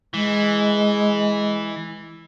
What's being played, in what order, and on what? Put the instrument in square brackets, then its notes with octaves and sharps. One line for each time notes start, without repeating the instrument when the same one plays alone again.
[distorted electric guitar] E3 [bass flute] G#3